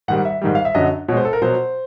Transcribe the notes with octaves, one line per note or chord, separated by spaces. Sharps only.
G#2 D#3 G3 F#5
E5
G#2 D#3 G3
F5
E5
F#2 D3 F#3 D#5
B2 G#3 C5 C#5
A4
A#4
B2 F#3 C5